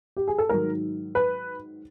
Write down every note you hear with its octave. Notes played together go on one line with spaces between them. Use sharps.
G4
G#4
A4
G#2 D#3 F#3 A#4
B4